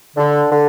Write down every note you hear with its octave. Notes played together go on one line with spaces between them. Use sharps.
D3
D3